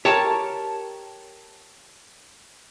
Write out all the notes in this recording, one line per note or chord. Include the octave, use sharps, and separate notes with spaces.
G4 A#4 C#5 A5